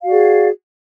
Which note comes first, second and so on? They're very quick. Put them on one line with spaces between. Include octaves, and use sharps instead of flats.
F5 F#4 D5 G#4